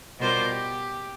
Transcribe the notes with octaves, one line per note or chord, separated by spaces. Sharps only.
B2 G3 F4 A#4 C5 D6
G4